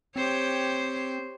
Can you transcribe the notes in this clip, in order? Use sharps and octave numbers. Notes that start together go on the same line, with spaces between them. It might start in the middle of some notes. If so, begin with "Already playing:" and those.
C4 G4 C5 C#5